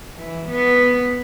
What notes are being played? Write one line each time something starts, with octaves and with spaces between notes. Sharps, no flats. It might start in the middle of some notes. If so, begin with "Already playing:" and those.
E3
B3